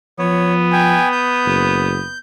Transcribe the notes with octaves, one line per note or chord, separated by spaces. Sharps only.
F3 B3 C#5
G5 G#5
G6
F#1